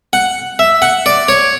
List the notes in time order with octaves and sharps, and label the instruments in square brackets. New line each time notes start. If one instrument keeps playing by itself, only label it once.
[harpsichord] F#5
E5
F#5
D5
C#5